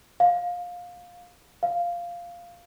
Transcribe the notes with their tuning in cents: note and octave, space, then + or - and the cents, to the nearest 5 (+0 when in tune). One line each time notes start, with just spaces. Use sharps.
F5 +20
F5 -5